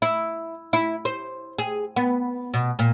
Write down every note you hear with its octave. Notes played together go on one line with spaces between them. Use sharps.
E4
E4
C5
G#4
B3
B2
A#2